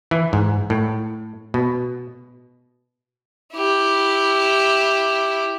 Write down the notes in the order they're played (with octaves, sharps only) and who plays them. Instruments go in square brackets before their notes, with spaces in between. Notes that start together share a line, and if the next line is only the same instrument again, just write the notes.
[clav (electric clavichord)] E3
G#2
A2
B2
[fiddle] E4 G4